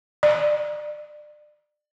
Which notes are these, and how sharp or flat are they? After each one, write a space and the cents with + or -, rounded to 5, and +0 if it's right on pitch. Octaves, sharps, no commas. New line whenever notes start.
D5 +30